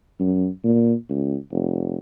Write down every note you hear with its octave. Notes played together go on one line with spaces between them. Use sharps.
F#2
A#2
C#2
F1